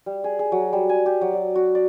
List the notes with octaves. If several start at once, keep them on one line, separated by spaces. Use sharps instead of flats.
G3
G#4
G#4
F#3
G3
G#5
G4
F#3
D5
F#4
D5